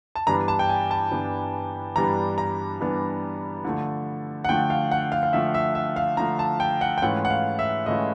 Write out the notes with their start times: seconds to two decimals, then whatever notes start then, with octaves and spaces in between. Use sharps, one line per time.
0.15 A5
0.27 G2 E3 G3 B3 D4 A#5
0.48 A5
0.59 G5
0.69 G#5
0.91 A5
1.11 G2 E3 G3 B3 D4
1.96 G2 E3 G3 B3 D4 A#5
2.38 A#5
2.80 G2 E3 G3 B3 D4
3.65 D3 F3 A3
4.44 F#5
4.49 D3 F3 A3 G5
4.70 F5
4.91 F#5
5.12 F5
5.23 F5
5.33 D3 F3 A3 E5
5.54 E5
5.75 E5
5.96 F5
6.17 D3 F3 A3 A#5
6.39 A5
6.60 G5
6.81 F#5
6.98 G5
7.02 G#2 E3 A3 C#4 F4 F#5
7.25 F#5
7.30 F5
7.59 E5
7.86 G#2 E3 A3 C#4 F4 D#5